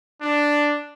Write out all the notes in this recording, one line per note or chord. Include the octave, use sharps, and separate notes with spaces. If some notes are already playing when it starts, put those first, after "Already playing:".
D4